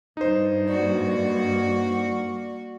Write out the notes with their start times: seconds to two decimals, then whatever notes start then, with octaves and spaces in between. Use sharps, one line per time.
0.17 G2 D#4 C5
0.68 A#3 F#4 D5